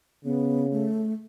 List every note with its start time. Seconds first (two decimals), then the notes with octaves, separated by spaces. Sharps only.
0.24 C#3 B3
0.72 A3